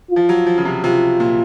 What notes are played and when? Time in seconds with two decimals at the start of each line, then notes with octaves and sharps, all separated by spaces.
0.10 F4
0.16 F3
0.29 F#3
0.47 F3
0.58 C#3
0.65 C3
0.83 C3 F4
1.20 A#2